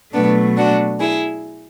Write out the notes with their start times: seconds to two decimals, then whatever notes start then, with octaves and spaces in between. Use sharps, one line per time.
0.13 B2 F#3 A3 B3 D4
0.56 D4 F#4
1.00 E4 G#4